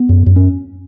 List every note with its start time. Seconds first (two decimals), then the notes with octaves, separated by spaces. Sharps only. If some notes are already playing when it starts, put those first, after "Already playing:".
Already playing: B3
0.09 F#2
0.26 F#2
0.36 C#4